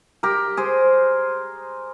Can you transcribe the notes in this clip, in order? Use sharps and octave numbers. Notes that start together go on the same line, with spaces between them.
G4 A#4
G#4 C5